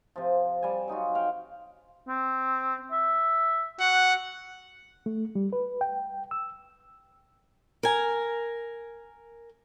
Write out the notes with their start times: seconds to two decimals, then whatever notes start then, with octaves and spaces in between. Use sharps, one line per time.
0.16 C3 F3
0.63 G3 G#5
0.88 F#3 D#4 F4 F#4
1.15 F5 G5
2.09 C4
2.92 E5
3.80 F#4 F#5
5.06 A3
5.35 G3
5.53 B4
5.81 G5
6.31 E6
7.83 A#4 G#5